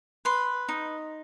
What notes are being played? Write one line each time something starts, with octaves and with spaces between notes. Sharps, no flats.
B4 C6
D#4